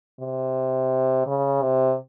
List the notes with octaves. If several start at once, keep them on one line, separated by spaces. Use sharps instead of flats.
C3
C#3
C3